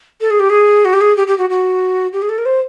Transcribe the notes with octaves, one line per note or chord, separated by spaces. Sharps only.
A4
G#4
G4
G#4
F#4
G4
G#4
G4
G4
F#4
F#4
G4
G#4
A4
A#4
C5